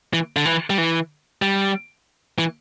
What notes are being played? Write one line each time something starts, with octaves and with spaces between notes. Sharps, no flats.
E3
D3
E3
G3
E3
G3
E3